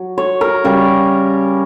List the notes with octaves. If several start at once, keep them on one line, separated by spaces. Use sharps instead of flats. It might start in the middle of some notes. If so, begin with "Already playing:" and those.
Already playing: F#3
C#5
A#4
C#3 G3 C#4 A#4